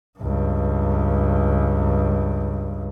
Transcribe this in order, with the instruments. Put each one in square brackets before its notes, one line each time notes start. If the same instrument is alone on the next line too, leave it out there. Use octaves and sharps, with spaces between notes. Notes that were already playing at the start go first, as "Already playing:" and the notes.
[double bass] C#2 G2